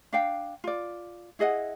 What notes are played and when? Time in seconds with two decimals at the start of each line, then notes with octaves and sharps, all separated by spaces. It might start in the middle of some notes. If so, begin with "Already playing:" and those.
0.13 D4 F5 G5
0.64 F4 D5
1.39 E4 G#4 D#5 F#5